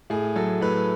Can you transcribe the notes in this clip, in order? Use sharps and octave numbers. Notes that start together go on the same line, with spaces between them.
A2 G#4
F#3 A4
A2 B4